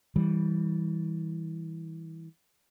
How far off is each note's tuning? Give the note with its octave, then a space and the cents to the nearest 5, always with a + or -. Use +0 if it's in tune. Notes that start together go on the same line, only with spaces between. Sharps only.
E3 -20 G3 +0